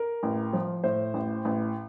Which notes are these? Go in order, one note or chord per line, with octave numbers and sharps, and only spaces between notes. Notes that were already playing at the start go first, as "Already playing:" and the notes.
Already playing: A#4
A1
F3
A2 C5
A1
A1